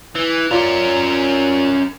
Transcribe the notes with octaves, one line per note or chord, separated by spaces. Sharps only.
E3
C#4 F4 A#4 D5